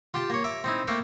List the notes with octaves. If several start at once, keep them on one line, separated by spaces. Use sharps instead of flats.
F4 G4 G5 A5
A#3 C#5
E5 A#5 D6
C4 D#4 E4
A3 A#3 A4 F5 G5